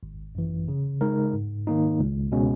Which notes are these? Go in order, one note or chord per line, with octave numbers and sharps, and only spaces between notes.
G#1
F#2 E3
C#3
G#3 D#4 A#4
G#2
D#3 A#3 D#4
C#2
B2 G#3 C#4